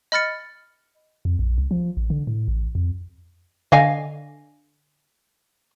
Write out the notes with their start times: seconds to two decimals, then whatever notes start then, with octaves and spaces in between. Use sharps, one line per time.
0.12 D#5 B5 F6 A6 C#7
1.25 F2
1.39 A#1
1.58 C2
1.71 F3
1.97 A1
2.10 D3
2.27 A2
2.48 A1
2.75 F2
3.72 D3 D#5 F5 G#5